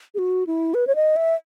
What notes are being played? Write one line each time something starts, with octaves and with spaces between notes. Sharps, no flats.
G#4
F#4
E4
B4
C#5
D#5
E5